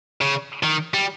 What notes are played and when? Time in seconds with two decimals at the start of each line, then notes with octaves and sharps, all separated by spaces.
0.21 C#3
0.63 D#3
0.94 G3